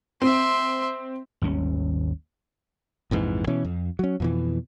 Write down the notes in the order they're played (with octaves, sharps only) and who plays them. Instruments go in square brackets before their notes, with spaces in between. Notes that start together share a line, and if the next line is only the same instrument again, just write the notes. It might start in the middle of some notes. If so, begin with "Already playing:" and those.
[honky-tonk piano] C4 [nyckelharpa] E5 C6
[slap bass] G#1 D#2 G3 C#4
[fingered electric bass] A#1 F2 G#2 E3
B2 E3 C#4
F2
F#3 C#4
F2 B2 E3